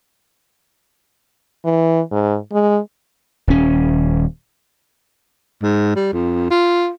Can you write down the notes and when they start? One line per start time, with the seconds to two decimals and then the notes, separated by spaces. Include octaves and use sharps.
1.65 E3
2.12 G#2
2.52 G#3
3.47 D#1 C#4
5.63 G#2
5.96 G3
6.12 F2
6.50 F4